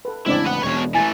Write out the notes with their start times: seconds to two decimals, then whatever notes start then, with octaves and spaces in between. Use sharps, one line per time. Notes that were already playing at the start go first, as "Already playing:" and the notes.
0.05 A4 B4
0.26 A1 C#3 G#3 C4 D4 E4 D5
0.45 B4 F#5
0.64 E1 B2 G#3 C#5
0.94 E3 A3 G#5 A6